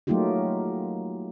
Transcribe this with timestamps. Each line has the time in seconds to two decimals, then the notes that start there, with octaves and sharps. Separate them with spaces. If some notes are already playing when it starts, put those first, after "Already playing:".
0.07 F#3 A3 A#3 D#4 F4 G4